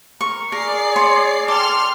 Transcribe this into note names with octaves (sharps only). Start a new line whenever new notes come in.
A#4 C#6
G#4 A#4 D5 C7
C#5 C6
A4 G5 C6 D6 F6